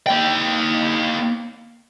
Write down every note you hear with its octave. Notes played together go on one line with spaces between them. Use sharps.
A#3 G5